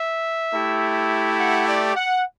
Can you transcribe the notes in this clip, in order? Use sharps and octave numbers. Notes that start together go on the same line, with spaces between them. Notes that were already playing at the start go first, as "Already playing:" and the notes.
Already playing: E5
A3 E4 G4
F#5
D5
F#5